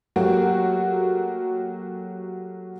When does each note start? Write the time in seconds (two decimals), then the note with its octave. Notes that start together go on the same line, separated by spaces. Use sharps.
0.16 F#3 A3 A#3 F#4 G4